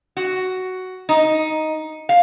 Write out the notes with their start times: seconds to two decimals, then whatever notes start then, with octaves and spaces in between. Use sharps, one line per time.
0.17 F#4
1.09 D#4
2.09 F5